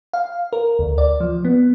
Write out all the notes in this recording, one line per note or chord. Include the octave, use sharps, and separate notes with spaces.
F5
A#4
D2
D5
F3
B3